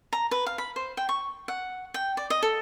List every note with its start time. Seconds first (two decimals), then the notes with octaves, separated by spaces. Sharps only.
0.13 A#5
0.31 B4
0.46 F5
0.58 B5
0.76 C5
0.97 G5
1.09 C#6
1.48 F#5
1.94 G5
2.17 D5
2.30 D#5
2.43 A4